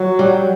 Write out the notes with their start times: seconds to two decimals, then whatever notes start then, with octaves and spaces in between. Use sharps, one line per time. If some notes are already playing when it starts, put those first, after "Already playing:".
Already playing: F#3
0.19 G3